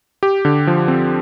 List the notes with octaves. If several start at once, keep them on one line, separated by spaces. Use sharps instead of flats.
G4
D3
F3
C4